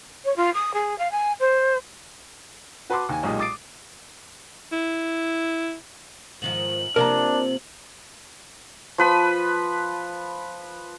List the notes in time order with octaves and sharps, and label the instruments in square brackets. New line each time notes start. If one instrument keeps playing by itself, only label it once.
[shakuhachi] C#5
F4
D#6
G#4
F5
G#5
C5
[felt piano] F#4 B4 A5 B5 C6 D6
D#2 G#5
B1 A#2 G#3 D#4 G4 D#6
D6 D#6 A6 C7 D7
[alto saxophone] E4
[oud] G#2 D#3 F3 [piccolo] F#7
[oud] C3 F3 A#3 [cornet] D4 [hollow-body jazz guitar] A#4 A#5
[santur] F3 B4 B5